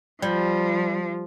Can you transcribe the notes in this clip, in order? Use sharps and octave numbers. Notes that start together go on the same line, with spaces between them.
F3 G3